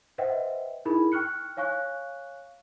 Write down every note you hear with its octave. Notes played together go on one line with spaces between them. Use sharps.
B4 C5 D#5 E5 F#5 G5
D#4 E4 G#4 A#4 B5
G5 C#6 F6 F#6 C#7
C#5 F5 G#5 C#6 F#6